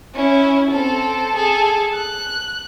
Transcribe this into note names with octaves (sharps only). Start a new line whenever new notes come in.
C#4 E4
C4 A4
G#4 A4
F#6